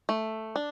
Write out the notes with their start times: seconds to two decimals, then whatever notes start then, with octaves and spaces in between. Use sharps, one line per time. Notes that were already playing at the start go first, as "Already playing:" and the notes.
0.09 A3
0.56 D4